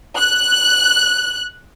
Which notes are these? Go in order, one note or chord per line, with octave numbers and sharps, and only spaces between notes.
F#6